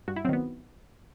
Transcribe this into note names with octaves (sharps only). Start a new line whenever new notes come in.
G2 F#4
E4
D#3 F#3 B3 C4